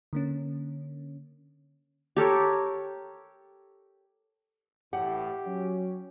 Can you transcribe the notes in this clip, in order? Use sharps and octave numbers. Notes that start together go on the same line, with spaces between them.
D3 A#3 C#4
G4 A4 A#4 C#5
A1 A2 G4 F#5
F#3 C#4